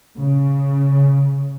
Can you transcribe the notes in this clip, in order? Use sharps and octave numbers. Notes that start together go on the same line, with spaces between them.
C#3